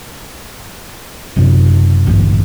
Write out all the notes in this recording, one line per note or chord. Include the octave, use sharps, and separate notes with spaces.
F#1 F#2 C3
A1 D2 G2 A#2